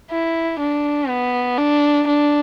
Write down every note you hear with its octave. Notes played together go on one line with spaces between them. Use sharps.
E4
D4
B3
D4
D4